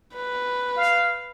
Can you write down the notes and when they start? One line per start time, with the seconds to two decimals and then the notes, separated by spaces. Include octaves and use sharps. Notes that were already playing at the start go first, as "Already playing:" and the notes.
0.15 B4
0.76 F5